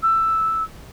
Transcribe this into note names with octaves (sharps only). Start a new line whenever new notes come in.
E6